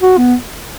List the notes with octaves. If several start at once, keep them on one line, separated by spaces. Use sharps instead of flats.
F#4
B3